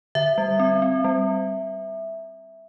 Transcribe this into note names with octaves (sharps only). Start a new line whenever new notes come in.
D3 E5
G3
C4
C4
G3